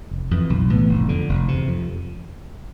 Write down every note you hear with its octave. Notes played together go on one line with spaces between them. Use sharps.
F1
F2 E3
B1
A2 E3 B3
F1
F2 D3
F1
E2 C3
F2